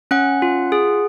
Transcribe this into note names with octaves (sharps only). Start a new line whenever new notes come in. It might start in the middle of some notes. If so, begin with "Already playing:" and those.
C#4 F#5 F#6
F4
G#4